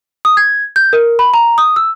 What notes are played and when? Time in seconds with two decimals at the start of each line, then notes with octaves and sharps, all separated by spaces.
0.25 D#6
0.37 G#6
0.76 G6
0.93 A#4
1.19 B5
1.34 A#5
1.58 D#6
1.76 E6